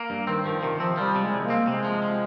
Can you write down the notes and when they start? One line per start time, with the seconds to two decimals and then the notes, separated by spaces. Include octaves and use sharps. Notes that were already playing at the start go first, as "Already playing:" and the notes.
Already playing: A#3
0.10 G2
0.27 D#3 C4
0.45 D#3 F3
0.62 C3 D#3
0.80 F3 C4
0.97 F3 G3
1.15 C3
1.21 G#3
1.33 C2
1.44 A#3
1.50 C4
1.67 C3 G#3
1.85 F3
2.03 F3